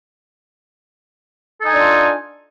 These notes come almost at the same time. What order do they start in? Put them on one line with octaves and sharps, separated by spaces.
A4 D#4 G#5 D4 F4